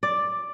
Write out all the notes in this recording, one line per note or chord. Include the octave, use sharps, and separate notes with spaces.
D5